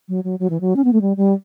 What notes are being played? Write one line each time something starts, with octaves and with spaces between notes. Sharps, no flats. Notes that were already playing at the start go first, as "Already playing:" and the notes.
F#3
F#3
F#3
E3
F#3
C#4
B3
A3
G3
G3